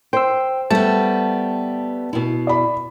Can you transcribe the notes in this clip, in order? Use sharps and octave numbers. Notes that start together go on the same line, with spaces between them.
C5 G5 E6
G3 A3 B3 A5
B2 E4
D5 B5